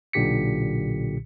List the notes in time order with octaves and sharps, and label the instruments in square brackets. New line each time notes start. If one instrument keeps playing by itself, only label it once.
[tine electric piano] B1 A#2 D3 G4 B6 C#7